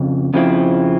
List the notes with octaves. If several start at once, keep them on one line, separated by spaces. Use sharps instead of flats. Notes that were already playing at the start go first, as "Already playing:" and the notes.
Already playing: F2 C#3
F2 C#3 F3 C4 E4